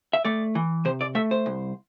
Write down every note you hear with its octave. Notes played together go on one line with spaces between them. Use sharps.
E5
A3 D5
E3
C3 C5
D5
A3 E5
C5
C2